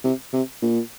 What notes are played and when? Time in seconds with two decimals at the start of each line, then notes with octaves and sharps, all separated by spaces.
0.04 C3
0.33 C3
0.62 A#2